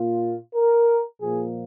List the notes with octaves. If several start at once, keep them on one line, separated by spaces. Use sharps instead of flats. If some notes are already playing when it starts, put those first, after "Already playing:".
Already playing: A#2 A#3 F4
A#4
A#2 F3 A#3 G#4